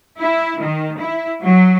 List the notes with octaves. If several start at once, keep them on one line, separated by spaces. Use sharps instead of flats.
E4
D#3
E4
F#3